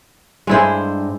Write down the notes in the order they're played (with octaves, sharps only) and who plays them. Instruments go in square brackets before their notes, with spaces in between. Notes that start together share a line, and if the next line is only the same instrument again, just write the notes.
[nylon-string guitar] G2 C5 [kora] G#3 E4 G#4